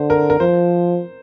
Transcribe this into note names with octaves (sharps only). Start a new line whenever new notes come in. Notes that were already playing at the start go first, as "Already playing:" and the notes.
Already playing: D3 C5
A#4
A#4
F3 C5